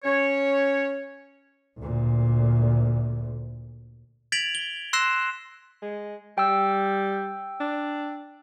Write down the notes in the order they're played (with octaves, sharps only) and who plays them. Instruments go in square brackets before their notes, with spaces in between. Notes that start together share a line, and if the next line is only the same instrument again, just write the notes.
[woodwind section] C#4 C#5
[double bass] D2 A#2
[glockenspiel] G#6 A6 B6 D7 F7 F#7
G7
C6 E6 F#6 A#6 C7 E7
[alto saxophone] G#3
[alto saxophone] G3 [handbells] G5 E6
[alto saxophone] D4